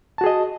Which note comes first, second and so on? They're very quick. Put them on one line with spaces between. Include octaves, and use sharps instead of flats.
A5 F#4 G#4 D#5